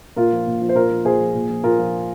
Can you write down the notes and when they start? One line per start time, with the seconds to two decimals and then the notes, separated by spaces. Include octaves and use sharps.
0.16 A#2 F4 A#4
0.32 F3
0.47 A#2
0.62 F3
0.69 C5
0.75 A#2 F4 A#4
0.90 F3
1.05 A#2 G#4 C5
1.20 F3
1.34 A#2
1.49 F3
1.64 A#2 F4 A#4
1.79 F3